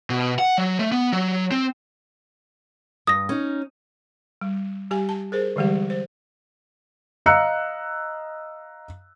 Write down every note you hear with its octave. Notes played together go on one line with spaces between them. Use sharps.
B2
F#5
F#3
A3
B3
F#3
C4
G2 D#6 A#6
C#4 D#4
G3
G3 G4 G#5
A5
G#4 A#4 C5
D3 E3 G3 G#3 G4
C5
D#5 F5 A#5 E6 F#6 C#7